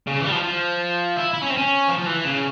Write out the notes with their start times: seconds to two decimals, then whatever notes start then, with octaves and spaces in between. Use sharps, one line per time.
0.07 C#3
0.20 E3
0.26 G3
0.32 F3
0.43 F3
1.17 E4
1.34 E4
1.41 C#4
1.50 C4
1.57 C#4
1.88 F3
1.99 F3
2.06 E3
2.25 C#3